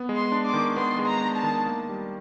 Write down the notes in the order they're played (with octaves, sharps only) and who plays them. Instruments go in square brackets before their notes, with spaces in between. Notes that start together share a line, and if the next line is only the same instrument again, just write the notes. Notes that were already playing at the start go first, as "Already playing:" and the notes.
Already playing: [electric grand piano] B3
G#3
[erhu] C6
[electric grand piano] D4
[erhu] D6
[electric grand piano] D#3
[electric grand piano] B3 [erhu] C6
[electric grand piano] G#3
[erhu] A#5
[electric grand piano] D4
[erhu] A5
[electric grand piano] D#3
A#3
G3